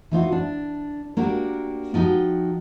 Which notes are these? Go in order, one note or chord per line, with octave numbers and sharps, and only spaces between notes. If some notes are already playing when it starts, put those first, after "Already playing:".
E3 D#4 F4 F#4
D4
A#3 D4 F#4 G4 A#4
F3 D#4 F#4 G4